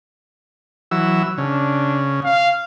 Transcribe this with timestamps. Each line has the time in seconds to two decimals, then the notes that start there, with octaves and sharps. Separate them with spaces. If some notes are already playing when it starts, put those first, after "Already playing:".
0.91 E3 F#3 E6
1.38 C#3 D4
2.24 F5